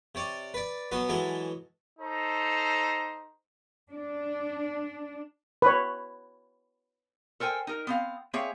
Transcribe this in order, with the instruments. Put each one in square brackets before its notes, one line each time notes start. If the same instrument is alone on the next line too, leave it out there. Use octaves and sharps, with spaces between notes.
[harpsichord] C3 C#5 D5
B4 D5
B2 F#3 B3 F#4 B4
E3 F#3 G#3 E4 A4
[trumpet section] D#4 A4 C5 A#5
[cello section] D4
[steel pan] B4 C#5
[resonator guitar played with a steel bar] A4 A#4 C5 G5 G#5
D#4 A#4
B3 C4 F5
A#3 C4 G#4 C#5 E5